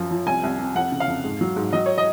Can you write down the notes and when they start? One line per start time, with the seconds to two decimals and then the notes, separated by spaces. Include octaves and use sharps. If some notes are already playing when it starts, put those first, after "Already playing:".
Already playing: F#2 F3
0.11 F3
0.26 C2 G#5
0.43 C2
0.59 C3
0.75 F2 F#5
0.92 C#3
1.00 F5
1.08 F2
1.24 G#2
1.41 F#3
1.56 G#2
1.73 F#3 D#5
1.86 C#5
1.98 D#5